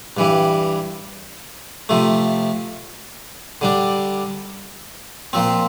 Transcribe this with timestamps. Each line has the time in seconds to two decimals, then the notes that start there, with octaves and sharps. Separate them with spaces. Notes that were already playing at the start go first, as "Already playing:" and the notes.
0.17 G2 E3 G3
1.89 C3 F3 A3
3.61 D3 G3 D4
5.33 A#2 F3 C4